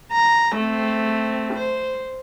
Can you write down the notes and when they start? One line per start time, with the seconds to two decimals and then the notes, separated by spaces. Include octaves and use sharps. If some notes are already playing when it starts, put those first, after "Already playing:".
0.12 A#5
0.55 A3 C4
1.54 C5